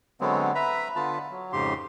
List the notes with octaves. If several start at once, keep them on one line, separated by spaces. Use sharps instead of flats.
D3 F#3 G#3 B3 C4
B4 E5 A#5 B5
D3 B3 F4 A5 B5
F#3
F2 G#2 C#3 G4 C6